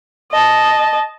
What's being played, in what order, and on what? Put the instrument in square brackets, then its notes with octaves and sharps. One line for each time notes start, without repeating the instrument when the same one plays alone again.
[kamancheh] D#5 A5